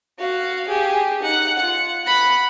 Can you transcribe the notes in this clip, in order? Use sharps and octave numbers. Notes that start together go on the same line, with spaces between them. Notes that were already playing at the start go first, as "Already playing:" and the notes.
F#4 F5
G4 G#4
D#4 F#5
F4 F#5
F#5 B5